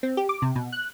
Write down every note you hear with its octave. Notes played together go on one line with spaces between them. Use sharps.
C4
G4
D6
C3
B2
F#6